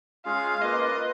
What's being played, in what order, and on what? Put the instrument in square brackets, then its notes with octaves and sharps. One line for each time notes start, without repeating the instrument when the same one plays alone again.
[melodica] G#3 C#4 F4 G#4 [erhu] F5
[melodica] A#3 F4 B4 [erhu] D#5
[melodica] B4